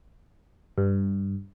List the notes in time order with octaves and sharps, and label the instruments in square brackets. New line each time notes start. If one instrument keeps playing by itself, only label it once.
[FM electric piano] G2